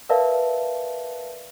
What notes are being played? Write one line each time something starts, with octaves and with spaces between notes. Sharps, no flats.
A#4 B4 D5 E5 F5 A5